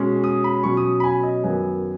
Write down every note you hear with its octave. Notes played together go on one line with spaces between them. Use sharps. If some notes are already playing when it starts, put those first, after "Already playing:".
Already playing: B2 G#3 C#4
D#6
B5
B2 F#3 C#4 C#6
D#6
B5
G#5
D#5
F#2 D#3 F#3 B3 G#5